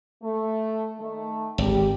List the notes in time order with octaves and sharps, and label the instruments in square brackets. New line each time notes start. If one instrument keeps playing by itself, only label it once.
[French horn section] A3
D#3 A3
[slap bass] G#1 [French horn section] G4